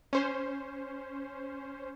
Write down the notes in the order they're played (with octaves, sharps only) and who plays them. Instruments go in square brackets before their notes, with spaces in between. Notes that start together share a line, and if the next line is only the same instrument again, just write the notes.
[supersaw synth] C#4 C5